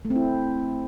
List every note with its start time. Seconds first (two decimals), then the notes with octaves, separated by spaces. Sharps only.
0.05 A3
0.10 C4
0.16 E4